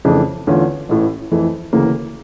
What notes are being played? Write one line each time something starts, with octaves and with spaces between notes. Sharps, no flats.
F2 C#3 E3 A3 D4
E2 D3 A3 C#4 F4
A1 A2 E3
F2 E3 A3 E4
D2 C#3 E3 A#3